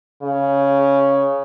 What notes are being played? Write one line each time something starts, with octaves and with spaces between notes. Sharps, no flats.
C#3